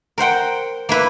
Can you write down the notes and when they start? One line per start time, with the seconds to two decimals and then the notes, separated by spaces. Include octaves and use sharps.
0.18 A#4 C5 F#5 G5
0.89 A#3 E4 B4